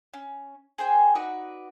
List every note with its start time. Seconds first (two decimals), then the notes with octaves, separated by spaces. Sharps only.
0.14 C#4
0.78 G#4 C5 G5 G#5
1.15 D#4 F#4 B4 D5